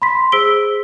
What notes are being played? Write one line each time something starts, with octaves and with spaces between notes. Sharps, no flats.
B5 C6 B6
G#4 C5 E6 B6 D7 G7